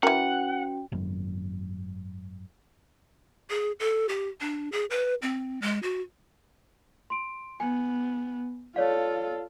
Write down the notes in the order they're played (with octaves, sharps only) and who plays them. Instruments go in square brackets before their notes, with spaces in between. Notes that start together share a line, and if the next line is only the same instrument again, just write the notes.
[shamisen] E3 A#4 [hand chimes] C#4 F#4 G5 [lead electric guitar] F#5
[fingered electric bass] G#1 F#2
[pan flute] G#4
A4
G4
D4
G#4
B4
C4
G#3
F#4
[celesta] C6 D7
[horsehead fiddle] B3 [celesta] G#5
[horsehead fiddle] F4 A4 [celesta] C#5 D5 F5